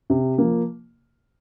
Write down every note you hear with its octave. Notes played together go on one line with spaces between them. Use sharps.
C3
F3 A#3